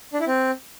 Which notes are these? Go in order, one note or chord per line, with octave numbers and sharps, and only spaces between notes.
D4
E4
C4